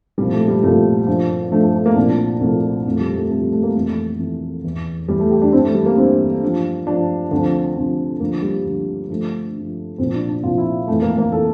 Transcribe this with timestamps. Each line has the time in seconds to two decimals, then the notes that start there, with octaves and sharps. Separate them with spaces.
0.18 C2 A#2 F3 G3
0.32 A3
0.48 G3
0.63 C2 A#2 F3 A3
1.07 G2 F3
1.52 G2 F3 A3
1.63 A3
1.75 A3
1.86 A#3
1.96 C2 A#2 F3 D4
2.41 C2 A#2 F3 A3
2.86 F2 C3 F3 A3
3.01 G3
3.16 A3
3.30 F2 C3 F3 A3
3.42 G3
3.52 A3
3.63 A#3
3.75 F2 E3 A3
4.19 F2 E3
4.64 E2 E3
5.08 E2 E3 G3
5.20 A3
5.31 G4
5.42 D4
5.52 G2 E3 C4
5.64 A3
5.75 G3
5.86 A#3
5.97 G2 E3 C4
6.42 G2 F3
6.87 G2 F3 D4
7.31 D2 C3 F3
7.76 D2 C3 F3
8.20 D2 D3 F3 A#3
8.43 G3
8.65 D2 D3 F3
9.10 G2 F3 A3
9.55 G2 F3
9.98 C2 A#2 F3 C4
10.14 D4
10.29 D4
10.43 C2 A#2 F3 F4
10.58 E4
10.88 F2 E3 A3
11.02 A#3
11.18 A#3
11.32 E3 A4